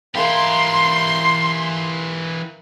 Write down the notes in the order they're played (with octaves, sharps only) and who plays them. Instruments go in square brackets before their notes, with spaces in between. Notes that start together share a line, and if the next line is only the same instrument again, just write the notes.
[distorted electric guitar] E3 G4 [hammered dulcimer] A#4 E5 F5 [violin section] C6